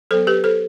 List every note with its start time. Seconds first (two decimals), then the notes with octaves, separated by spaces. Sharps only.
0.11 F#3 B3 A4 C5
0.27 G4 B4
0.44 A4 C5